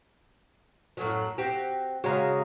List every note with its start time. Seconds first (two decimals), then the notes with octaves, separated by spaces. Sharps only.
0.97 F#2 A2 F#3
1.38 C4 F#4 G4
2.04 C#3 G#3 F#4 C#5 A#5